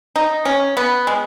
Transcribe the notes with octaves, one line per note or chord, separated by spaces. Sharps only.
D#4
C#4
B3
G#3